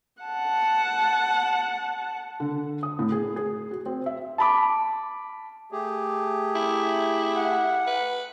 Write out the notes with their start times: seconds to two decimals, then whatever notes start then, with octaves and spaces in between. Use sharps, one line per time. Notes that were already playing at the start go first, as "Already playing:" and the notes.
0.23 F#5 A5
2.40 D3
2.83 D#6
2.99 A2
3.12 G#4
3.36 G#4
3.71 F#4
3.86 C4
4.06 E5
4.38 A5 B5 D6
5.72 A3 G4 G#4
6.55 E4
7.36 F#5
7.87 B4